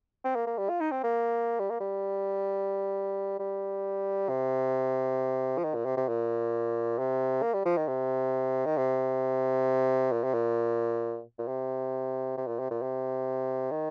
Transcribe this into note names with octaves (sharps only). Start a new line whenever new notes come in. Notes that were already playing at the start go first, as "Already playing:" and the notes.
C4
A#3
A#3
G3
F4
D#4
C4
A#3
G3
A#3
G3
G3
C3
F3
D#3
A#2
C3
C3
A#2
C3
A#3
G3
F3
D#3
C3
D#3
C3
A#2
C3
A#2
A#2
C3
C3
A#2
C3
A#2
C3
D#3